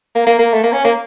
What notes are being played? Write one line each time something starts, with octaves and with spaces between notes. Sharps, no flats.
A#3
A#3
A#3
A3
A#3
C#4
A#3